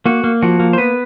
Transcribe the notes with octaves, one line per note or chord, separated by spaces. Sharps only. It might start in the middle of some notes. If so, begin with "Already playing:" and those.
A#3 F#4
A#3
F3 F#4
A#3
C5
B3 B4